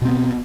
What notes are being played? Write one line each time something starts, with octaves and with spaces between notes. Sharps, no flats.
B2 B3 C4